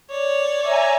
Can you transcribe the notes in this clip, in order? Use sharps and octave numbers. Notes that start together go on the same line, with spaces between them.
C#5 D5
E5 G#5 A#5